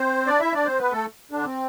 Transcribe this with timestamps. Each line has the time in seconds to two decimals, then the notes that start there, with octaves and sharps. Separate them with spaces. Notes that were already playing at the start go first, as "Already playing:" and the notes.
Already playing: C4 C5
0.27 D4 D5
0.40 E4 E5
0.53 D4 D5
0.65 C4 C5
0.79 B3 B4
0.92 A3 A4
1.31 D3 D4
1.45 C4